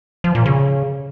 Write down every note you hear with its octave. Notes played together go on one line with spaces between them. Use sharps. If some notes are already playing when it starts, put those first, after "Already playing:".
F3
A#2
C#3